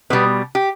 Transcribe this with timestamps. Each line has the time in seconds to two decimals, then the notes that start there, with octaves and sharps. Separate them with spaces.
0.10 B2 G3 B3
0.55 G4